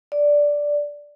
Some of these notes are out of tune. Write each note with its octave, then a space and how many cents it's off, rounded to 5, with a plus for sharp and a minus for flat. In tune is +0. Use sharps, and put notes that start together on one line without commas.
D5 -5